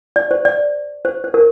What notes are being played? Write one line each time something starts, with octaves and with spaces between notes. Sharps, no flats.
D5
C5
D5
C5
C5
A#4